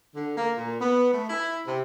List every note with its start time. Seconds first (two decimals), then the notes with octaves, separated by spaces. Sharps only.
0.16 D3
0.37 A#3
0.57 A#2
0.81 B3
1.12 A3
1.29 E4
1.66 C3